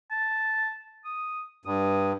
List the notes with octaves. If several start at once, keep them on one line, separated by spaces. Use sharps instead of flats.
A5
D#6
G2 D#6